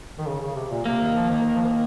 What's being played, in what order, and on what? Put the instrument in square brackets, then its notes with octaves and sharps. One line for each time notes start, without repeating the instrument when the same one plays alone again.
[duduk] D#3
C#3
C#3
C3
A#2
[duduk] C3 [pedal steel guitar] A#3
[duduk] D#3
F3
D#3
D#3
F3
D#3